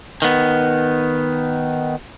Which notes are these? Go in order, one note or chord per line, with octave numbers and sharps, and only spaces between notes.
D#3 B3